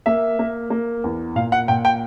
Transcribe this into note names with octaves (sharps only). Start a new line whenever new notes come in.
A#3 E5
A#3
A#3
E2
A#2 F5
F#5
A#2 G5
G5